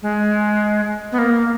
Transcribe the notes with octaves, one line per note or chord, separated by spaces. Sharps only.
G#3
B3
A#3